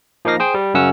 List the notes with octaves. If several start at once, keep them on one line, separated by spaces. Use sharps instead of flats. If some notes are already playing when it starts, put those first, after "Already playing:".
F3 A#3 D#4 F5 A#6
G#4 C5 G5
G3
F#2 C#3 F#3 C#4 F#5 E6